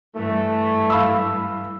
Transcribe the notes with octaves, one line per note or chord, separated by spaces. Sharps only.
G2 E3 A3
F5 B5 E6